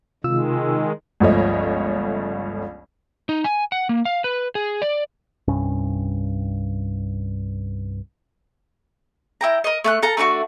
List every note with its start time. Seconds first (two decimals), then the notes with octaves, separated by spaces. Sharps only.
0.24 C3 D#3 G#3 F4 E6
1.20 G1 C#2 F3 A3 C#5 D#5
3.29 D#4
3.44 G#5
3.72 F#5
3.89 A#3
4.05 F5
4.24 B4
4.55 G#4
4.82 D5
5.48 C2 G2 C#4
9.41 E4 G5 A#5
9.64 A#4 D#5
9.84 A3 A5 F#6
10.03 A4 F5 A#5
10.17 A3 D4 D#4 F#4